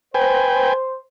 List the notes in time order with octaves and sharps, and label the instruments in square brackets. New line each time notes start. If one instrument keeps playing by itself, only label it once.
[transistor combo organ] B4 G5 G#5 [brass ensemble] C5